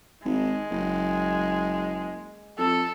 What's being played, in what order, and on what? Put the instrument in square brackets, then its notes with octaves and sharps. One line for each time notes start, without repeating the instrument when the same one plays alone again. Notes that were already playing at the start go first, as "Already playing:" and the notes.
[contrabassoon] G#1 [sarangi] G#3
[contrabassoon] F#1
[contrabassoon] F2 [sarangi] A4